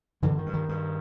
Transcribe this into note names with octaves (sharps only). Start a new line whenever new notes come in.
G2 D3 E3
D#3
G2
D#3
G2